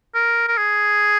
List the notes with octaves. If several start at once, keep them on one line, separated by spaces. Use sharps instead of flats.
A#4
A#4
G#4